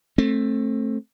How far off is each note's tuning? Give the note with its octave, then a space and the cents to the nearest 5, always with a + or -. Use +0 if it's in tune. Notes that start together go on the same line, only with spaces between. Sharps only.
A3 +0 C4 +25